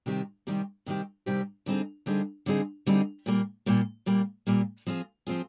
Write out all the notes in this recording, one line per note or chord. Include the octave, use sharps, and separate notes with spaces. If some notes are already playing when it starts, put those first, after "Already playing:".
C3 D#3 G3 C4 G4
C3 D#3 G3 C4 G4
C3 D#3 G3 C4 G4
C3 D#3 G3 C4 G4
D3 G3 C4 D#4 G#4
D3 G3 C4 D#4 G#4
D3 G3 C4 D#4 G#4
D3 G3 C4 D#4 G#4
A#2 G3 A#3
A#2 G3 A#3
A#2 G3 A#3
A#2 G3 A#3
F3 C4 F4 G#4
F3 C4 F4 G#4